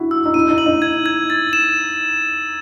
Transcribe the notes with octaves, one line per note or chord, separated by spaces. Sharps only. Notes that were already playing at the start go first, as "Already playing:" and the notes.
Already playing: E4 F#4
E6
D#4
E4 D#7
D#4
F#7
D#4
G#6
G#6
A6
E7